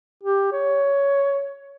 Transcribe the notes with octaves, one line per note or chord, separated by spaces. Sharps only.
G4
C#5